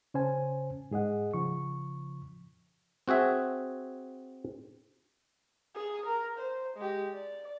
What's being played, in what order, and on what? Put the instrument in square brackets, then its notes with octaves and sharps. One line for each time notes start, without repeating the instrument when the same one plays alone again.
[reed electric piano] C#3 C#4 C5 G#5 A5
G#2 G#4 D#5 F#5
C#3 F3 C#6
[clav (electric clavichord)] C4 F#4 G#4 E5
[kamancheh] G#4
A#4
C5
G#3 G4
D5